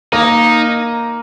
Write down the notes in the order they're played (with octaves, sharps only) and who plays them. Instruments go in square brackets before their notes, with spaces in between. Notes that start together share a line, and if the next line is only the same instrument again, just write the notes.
[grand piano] A#3 A#4 [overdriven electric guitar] D#4